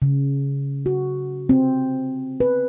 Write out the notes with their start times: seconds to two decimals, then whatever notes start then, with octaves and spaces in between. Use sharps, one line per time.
0.02 C#3
0.86 F#4
1.49 C4
2.40 B4